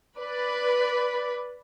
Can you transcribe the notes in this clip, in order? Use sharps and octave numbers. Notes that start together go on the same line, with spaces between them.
B4 D5 B5